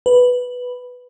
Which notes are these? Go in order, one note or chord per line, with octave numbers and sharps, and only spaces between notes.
B4